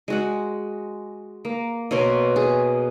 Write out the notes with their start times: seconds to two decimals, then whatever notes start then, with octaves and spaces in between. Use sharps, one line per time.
0.08 G#3 F#4 F#5
1.45 A#3
1.91 B2 A#3 C#5 C6
2.36 G#4